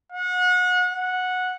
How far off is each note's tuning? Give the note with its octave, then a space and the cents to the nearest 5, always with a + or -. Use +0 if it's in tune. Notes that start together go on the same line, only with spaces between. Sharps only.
F#5 -35
F#5 -10